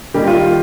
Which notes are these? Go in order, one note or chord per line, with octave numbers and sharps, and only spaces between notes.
D#3 G3 A#3 G4
F4